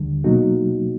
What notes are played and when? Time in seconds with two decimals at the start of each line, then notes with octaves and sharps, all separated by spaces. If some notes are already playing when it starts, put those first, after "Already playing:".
Already playing: D#2 D3 G3
0.24 B2 F#3 A#3 D#4 F#4